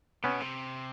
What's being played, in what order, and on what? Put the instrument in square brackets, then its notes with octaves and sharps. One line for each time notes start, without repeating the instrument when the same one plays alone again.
[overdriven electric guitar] C3 [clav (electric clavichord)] B3 C#4
[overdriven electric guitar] B2
C3